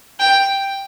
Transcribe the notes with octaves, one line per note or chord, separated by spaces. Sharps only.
G5